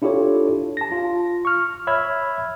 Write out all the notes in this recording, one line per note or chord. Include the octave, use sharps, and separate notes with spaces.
D4 E4 F4 G4 A4 C#5
A5 A#6
F4
C#6 F6
C#5 E5 B5 E6 F6 G#6